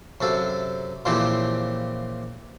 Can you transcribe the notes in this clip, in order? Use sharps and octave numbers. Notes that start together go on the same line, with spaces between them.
F#2 C3 A4 F5
A#2 C#3 E3 F3 C4 G4